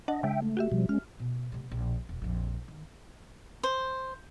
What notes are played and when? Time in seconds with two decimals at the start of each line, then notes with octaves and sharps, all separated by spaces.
0.08 D4 D#5 F#5 A5
0.23 C#3 G#3 E5 G5
0.42 A3
0.57 F#4 G4 E5
0.72 B2 F3 G3
0.89 G#3 C#4 F6
1.20 B2
1.52 C3 A3
1.70 A#1 B2
2.09 E1
2.22 A#1 F2
2.68 D#3
3.63 C5